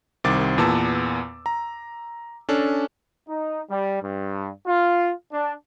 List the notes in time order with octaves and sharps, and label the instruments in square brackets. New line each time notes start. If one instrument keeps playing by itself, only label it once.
[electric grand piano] C2 D#3 C4 D6 A6
E2 A#2 B3 A5 E6
A#5
C#4 D4 A4
[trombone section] D#4
G3
G2
F4
D4